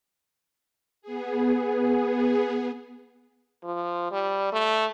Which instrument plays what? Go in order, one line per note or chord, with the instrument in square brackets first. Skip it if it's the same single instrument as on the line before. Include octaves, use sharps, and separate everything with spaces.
[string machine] B3 G#4
[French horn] F3
G3
A3